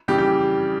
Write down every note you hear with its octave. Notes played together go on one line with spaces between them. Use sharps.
F2 C#3 E3 G3 G4
G4